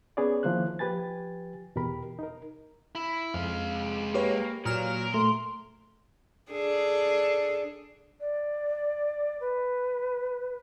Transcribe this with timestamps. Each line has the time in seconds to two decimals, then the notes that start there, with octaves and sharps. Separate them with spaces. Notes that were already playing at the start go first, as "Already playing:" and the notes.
0.17 B3 C#4 G#4 B4 C#5 D5
0.43 D#3 F3 A#3 E4 C5 F#6
0.79 F3 G4 B4 G#5 A6
1.76 E2 B2 G4 A#4 B5
2.19 D#4 A#4
2.95 E4
3.34 F2 G#3 F5
4.14 A#3 G4 B4 C#5
4.66 A#2 F#3 A#4 F6 E7
5.14 A3 C6
6.52 D4 G#4 A4
8.20 D5
9.41 B4